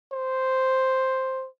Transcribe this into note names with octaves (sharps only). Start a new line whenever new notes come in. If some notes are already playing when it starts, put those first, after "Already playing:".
C5